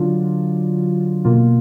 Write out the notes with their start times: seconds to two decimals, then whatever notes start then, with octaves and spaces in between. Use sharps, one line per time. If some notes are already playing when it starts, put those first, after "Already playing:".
Already playing: D3 F#3 D4 F4
1.25 B2 A#3 F4